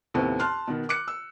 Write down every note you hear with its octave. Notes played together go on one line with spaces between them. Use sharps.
D#2 A2 C3 B3 C4
A5 C6 F6 F#6
B2 D#3
D6 F#6 C#7
E6